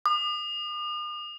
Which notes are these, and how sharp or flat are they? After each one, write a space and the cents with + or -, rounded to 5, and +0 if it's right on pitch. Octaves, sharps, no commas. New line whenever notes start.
D#6 -45